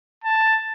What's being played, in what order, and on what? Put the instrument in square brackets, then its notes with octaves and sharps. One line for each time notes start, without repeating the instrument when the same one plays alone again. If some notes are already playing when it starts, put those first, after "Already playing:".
[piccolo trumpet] A5